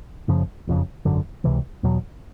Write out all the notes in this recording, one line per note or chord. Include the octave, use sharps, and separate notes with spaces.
F#1 F#2 C#3 F3
F#1 F2 C#3
G#1 F#2 D3
C#2 C3 E3
E2 B2 F#3